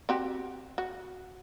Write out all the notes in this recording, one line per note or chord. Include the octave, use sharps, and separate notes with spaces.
C4 F#4 G4
F#4